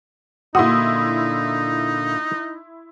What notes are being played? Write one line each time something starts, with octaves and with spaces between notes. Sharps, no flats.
A#2 D3 D#4 E4 F#4 C6 D#6